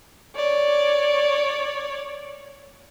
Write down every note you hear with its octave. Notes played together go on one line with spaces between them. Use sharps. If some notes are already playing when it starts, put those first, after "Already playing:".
C#5 D5